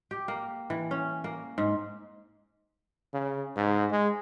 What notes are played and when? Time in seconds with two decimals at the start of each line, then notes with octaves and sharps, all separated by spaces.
0.11 G4
0.28 A#3
0.70 E3
0.91 C#4
1.24 A#3
1.58 G#2
3.14 C#3
3.57 G#2
3.91 G#3